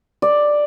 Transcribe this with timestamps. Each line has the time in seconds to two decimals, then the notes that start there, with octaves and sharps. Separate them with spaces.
0.22 D5